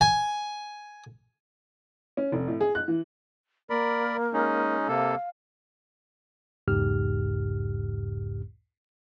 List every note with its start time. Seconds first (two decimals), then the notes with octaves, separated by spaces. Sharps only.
0.01 G#5
2.17 C#4
2.32 F1
2.48 A2
2.61 G#4
2.75 F#6
2.88 E3
3.70 A#3 A#4 D5 B5
4.33 G#3 C#4 D#4
4.88 C3 A#3 A4 F5
6.68 B1 E2 G#2 C#3 G4 F6